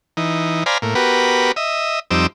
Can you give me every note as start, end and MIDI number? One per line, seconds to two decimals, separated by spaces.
0.17 0.64 52
0.17 0.64 63
0.66 0.78 72
0.66 0.78 74
0.66 0.78 77
0.66 0.78 80
0.66 0.78 82
0.66 0.78 83
0.82 0.94 45
0.82 0.94 58
0.95 1.52 59
0.95 1.52 66
0.95 1.52 67
0.95 1.52 70
0.95 1.52 71
1.56 2.00 75
1.56 2.00 76
2.11 2.27 41
2.11 2.27 55
2.11 2.27 60
2.11 2.27 63
2.11 2.27 86
2.11 2.27 88